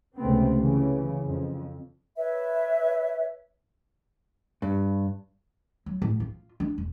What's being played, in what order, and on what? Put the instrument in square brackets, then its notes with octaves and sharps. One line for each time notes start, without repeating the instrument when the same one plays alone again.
[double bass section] C#2 C3 A3 B3 C4
C#3 E3
F2
[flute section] B4 C#5 E5
[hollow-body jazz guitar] G2
[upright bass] F#3
A2
F4
D4
E1